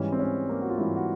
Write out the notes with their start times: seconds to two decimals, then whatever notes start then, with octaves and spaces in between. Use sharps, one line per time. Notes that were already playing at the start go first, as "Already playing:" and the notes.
Already playing: G#2 E3 G3 C#4
0.12 C4
0.19 C#4
0.49 A#3
0.61 F#4
0.70 F4
0.78 G#2 E3 G3 E4
0.97 F#4